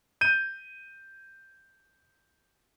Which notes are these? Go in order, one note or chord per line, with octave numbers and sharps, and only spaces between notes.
G6 D#7